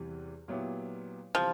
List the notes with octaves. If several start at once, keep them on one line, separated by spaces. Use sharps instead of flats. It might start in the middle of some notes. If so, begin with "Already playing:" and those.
Already playing: E2 C3 E3 G3
A#2 F#3 B3 E4 G4
C3 E3 F3 G3